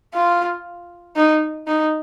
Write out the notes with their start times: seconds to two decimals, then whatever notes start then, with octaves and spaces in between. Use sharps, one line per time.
0.14 F4
1.16 D#4
1.67 D#4